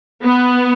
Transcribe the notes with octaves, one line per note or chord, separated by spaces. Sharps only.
B3